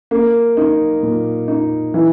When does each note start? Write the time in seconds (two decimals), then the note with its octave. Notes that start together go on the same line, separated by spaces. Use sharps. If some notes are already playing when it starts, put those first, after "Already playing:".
0.11 A#3
0.57 D#4
1.03 A#2
1.48 D#4
1.94 E3